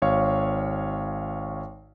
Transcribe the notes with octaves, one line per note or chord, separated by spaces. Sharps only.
G#1 C#5 F5 C#6